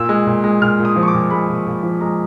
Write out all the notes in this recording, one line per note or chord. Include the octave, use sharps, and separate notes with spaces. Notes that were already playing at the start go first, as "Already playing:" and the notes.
Already playing: A#2 E6
G#3
A#2
G#3
A#2 F6
A#2
D#6
F3
C#6
D6
A#2
G#3 B5
A#2
A#2
F3
G#3 A#5